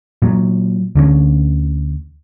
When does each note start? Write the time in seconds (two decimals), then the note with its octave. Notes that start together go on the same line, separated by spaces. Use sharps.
0.22 A#2 F#3
0.96 D2 D3 D#3 C#4